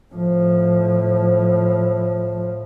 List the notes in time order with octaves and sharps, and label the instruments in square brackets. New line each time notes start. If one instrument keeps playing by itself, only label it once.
[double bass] A2 F3